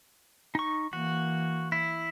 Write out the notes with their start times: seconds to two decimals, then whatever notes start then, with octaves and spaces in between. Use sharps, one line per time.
0.55 D#4 C#6
0.93 E3 A#3 F#4
1.72 E4